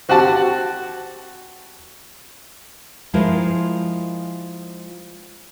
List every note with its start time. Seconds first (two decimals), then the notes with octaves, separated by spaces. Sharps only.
0.09 C4 F#4 G4 F#5 A5
3.14 F3 G#3 E4 F4 A#4 C5